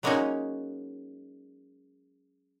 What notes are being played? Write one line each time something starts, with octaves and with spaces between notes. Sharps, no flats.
F#3 G#3 A#3 C#4 D#4 C#5